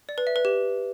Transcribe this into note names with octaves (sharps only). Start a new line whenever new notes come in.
D5
B4
E5
B4
G4